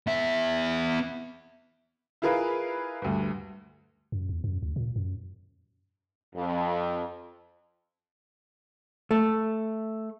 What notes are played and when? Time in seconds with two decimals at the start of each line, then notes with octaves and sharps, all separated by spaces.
0.07 B3 E5
2.22 E4 F4 G#4 A#4 B4 F5
3.02 D2 G2
4.12 F#2
4.29 E2
4.44 F#2
4.63 D2
4.76 A#2
4.96 F#2
6.35 F2
9.11 A3